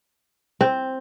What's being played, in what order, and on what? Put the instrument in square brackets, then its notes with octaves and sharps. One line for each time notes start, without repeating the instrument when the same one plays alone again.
[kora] C4